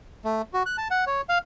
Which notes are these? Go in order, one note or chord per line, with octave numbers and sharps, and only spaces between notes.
A3
F#4
F#6
A5
F#5
C#5
F5